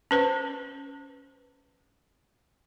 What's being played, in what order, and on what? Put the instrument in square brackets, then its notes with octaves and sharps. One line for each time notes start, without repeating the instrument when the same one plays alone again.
[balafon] C#4 B4 C5